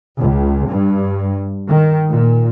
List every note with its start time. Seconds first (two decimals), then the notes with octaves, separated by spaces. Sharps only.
0.19 C#2
0.67 G2
1.68 D#3
2.13 A#2